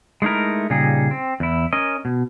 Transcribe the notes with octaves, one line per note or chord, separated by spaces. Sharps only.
G#3 A3 D#4 E4 A#4
A#2 C#3 G3 D#4 G#4
C4
E2 E4
C#4 A#4 D#5
B2